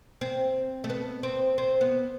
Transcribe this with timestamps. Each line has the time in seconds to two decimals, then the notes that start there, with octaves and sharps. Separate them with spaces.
0.21 C4
0.84 A3
0.90 B3
1.23 C4
1.58 C4
1.81 B3